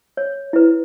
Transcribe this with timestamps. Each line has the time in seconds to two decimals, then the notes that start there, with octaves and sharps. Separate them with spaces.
0.17 C#5
0.53 E4 B4